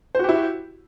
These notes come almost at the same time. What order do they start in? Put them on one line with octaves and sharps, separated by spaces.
C5 F#4 G4 E4